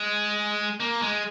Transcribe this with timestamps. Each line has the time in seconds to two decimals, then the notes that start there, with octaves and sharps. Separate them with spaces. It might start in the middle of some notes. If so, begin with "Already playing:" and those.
Already playing: G#3
0.80 A#3
1.02 G#3